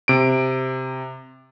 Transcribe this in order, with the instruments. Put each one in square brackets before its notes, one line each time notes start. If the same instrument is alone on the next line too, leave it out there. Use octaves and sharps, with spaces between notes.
[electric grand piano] C3 D7